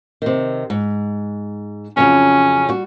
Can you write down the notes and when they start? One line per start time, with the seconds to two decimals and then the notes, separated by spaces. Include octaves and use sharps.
0.22 C3 D#3
0.70 G#2
1.97 F2 C#3 F#3 C#4
2.69 G3 F#4